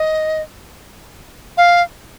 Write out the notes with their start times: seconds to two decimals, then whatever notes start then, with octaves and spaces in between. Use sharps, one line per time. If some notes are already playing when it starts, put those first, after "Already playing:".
Already playing: D#5
1.57 F5